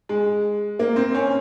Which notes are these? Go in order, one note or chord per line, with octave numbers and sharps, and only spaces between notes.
G#3
A#3
C4
C#4